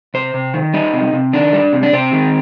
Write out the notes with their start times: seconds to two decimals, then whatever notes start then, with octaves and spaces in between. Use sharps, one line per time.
0.14 C3 C5
0.34 C3
0.54 D#3
0.74 G3 D#4
0.94 C3
1.13 C3
1.33 D#3 D4
1.53 G3
1.73 C3
1.83 D4
1.93 C3 C4
2.13 D#3